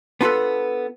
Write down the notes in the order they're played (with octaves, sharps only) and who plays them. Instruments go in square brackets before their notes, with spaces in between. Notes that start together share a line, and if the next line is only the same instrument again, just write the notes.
[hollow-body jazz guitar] B3 D4 F4 F#4 A4 B4